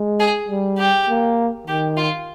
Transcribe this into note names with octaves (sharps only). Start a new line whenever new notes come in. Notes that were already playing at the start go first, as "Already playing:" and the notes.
Already playing: G#3
G#4
G3
G4
A#3
D#3 G4
F4